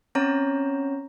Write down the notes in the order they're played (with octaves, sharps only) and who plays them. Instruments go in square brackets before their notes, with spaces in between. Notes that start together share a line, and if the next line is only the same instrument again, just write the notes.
[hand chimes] C4 C#4 C#5 A#5